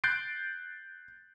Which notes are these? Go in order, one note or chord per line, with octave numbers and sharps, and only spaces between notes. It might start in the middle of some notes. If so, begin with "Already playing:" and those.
F#6 G6 A6 C7 D7